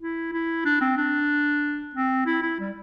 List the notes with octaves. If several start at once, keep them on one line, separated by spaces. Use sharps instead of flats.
E4
E4
D4
C4
D4
C4
E4
E4
G3